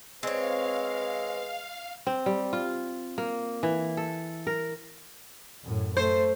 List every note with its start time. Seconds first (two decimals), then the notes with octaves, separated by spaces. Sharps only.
0.23 G#3 C4 B4 C#5 F5
2.07 C4
2.26 G3
2.53 F4
3.18 A#3
3.63 E3
3.97 A4
4.47 A#4
5.64 F#2 A2
5.97 A3 C5